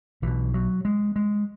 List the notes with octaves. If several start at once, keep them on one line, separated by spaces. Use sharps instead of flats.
B1 B2 E3
F#3
G#3
G#3